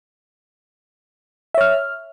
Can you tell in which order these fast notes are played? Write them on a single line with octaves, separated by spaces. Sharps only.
E5 C#5 F6